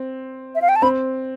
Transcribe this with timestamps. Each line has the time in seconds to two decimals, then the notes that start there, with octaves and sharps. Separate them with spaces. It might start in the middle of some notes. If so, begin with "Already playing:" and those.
Already playing: C4
0.55 E5
0.62 F5
0.69 G5
0.76 A5
0.82 C4 B5